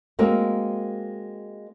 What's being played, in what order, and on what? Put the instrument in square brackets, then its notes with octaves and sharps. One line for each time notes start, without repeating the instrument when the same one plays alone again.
[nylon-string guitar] G#3 A#3 C4 F#4 A#4